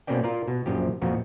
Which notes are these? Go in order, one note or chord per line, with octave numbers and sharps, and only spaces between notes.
B2 A#3 C4 C#4 D5 G5
F4 A#4 D5
B2
A#1 F#2 F3 G4
F2 A#2 F3 F#4